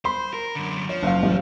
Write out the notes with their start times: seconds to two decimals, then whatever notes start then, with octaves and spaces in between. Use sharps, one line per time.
0.05 C5 B5 C6
0.34 A#4
0.55 F#2 D3
0.89 F3 C#5
1.03 F#1 F5
1.22 A1 G3